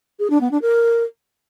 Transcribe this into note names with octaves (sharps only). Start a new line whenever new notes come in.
G#4
D4
B3
D4
A#4